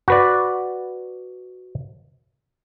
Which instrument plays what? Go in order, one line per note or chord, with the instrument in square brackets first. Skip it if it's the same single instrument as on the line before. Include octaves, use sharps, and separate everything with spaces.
[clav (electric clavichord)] F#4 B4 D5